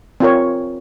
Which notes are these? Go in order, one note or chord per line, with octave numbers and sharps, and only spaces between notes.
C4 F4 A#4 C#5